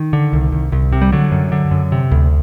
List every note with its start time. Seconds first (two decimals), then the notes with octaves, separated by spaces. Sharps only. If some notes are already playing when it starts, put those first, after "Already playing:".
Already playing: D#3
0.13 D3
0.33 C2
0.52 C2
0.72 C2
0.92 C3
1.02 G3
1.12 D3 F#3
1.32 F#2
1.52 D3
1.71 F#2
1.92 C3
2.11 D2